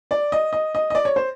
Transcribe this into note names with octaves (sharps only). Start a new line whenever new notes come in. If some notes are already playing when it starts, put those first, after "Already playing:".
D5
D#5
D#5
D#5
D#5
D5
C#5
C5